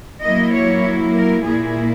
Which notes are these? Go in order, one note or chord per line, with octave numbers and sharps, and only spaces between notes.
F#3 A#3 E4 D#5
C#5
A#4
A#2 A#3 E4 G#4